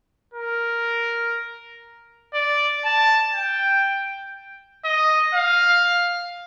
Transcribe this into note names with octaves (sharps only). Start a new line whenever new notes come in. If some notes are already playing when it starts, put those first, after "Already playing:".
A#4
D5
A5
G5
D#5
F5